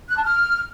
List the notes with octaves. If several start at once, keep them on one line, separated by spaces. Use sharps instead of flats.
F#6
A5
F6